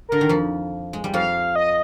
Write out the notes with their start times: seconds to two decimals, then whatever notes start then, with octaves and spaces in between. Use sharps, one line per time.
0.09 D3 A#4
0.21 D#3
0.29 F2 F3
0.93 G#3
1.04 G3
1.14 F2 F3 F5
1.56 D#5